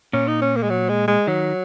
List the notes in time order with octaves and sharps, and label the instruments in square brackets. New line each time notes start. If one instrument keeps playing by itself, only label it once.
[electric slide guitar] A#2 [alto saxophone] C#4
[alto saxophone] D#4
C#4
A#3
G#3
F#3
G#3
G#3
[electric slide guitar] D#3 [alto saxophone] F#3